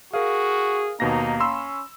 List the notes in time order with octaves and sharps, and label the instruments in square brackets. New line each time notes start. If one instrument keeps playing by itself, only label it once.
[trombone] F#4 [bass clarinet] G#4 [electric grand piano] A#4 F5
[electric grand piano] D#2 B2 A#6 [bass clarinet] A#3 [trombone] D#4
[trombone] C#4 [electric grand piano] B5 C6 E6